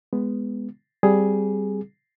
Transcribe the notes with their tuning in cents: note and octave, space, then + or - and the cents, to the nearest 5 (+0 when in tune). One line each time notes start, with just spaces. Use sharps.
G#3 +0 B3 +5
G3 +0 C4 +0 G#4 +5